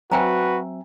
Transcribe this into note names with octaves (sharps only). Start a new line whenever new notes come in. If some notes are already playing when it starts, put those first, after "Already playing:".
F#3 C4 F#4 B4 E5 G5 G#5 A#5